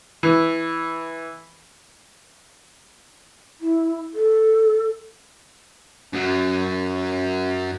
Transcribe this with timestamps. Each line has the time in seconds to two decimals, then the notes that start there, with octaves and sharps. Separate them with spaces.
0.23 E3
3.60 E4
4.14 A4
6.13 F#2 F#3